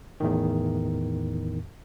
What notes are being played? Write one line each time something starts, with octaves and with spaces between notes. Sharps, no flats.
E2 A2 D#3